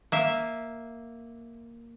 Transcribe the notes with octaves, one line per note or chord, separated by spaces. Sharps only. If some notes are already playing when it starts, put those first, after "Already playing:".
A#3 E5